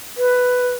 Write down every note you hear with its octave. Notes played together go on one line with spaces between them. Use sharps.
B4